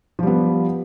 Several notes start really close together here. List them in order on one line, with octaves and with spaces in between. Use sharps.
F3 G3 B3